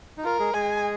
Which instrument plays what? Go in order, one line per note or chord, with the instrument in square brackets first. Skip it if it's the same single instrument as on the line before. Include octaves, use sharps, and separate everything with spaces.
[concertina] D#4
[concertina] F4 [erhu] A#4
[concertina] G#3 G#4
[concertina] G#3 G#4 [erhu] G#5